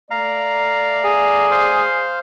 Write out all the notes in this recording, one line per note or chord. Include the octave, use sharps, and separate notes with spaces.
A3 D5 F5 A#5
G#4
C5 F5